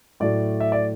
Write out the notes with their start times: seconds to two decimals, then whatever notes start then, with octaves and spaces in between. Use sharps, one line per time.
0.20 A2 F#3 A3 D5
0.60 E5
0.72 D5